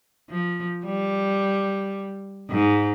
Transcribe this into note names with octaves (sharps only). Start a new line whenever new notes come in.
F3
G3
G#2